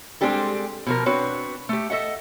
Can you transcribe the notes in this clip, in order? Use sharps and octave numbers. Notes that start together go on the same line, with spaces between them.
G3 G#3 C4 D4 G4 A4
B2 F3 A#4
C4 D4 F#4 B4 C#5
A3 G4
A4 D#5 E5 F#5